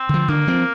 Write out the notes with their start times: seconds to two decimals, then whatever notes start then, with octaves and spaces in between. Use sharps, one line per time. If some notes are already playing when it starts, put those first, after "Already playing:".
Already playing: C4
0.09 D3 F3
0.28 D3 A#3
0.47 F3 C4